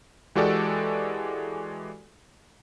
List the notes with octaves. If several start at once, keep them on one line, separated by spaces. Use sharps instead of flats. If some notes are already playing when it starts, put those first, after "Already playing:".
E3 G#3 F#4 G4 A4 D5